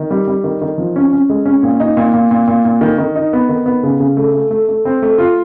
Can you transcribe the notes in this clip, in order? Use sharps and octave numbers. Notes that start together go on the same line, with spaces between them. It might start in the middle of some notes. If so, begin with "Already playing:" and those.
Already playing: D#3
G3
G3
D#3
D#3
F3
C#4
C#4
G#3
C#4
A#2
D#4
A#2
A#2
A#2
A#2
A#2
D#3
D#3
D#4
B3
D#3
B3
C#3
C#3
A3
A3
A3
A3
C4
A3
F4